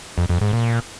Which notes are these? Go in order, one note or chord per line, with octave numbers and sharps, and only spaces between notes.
F2
F2
G#2
A#2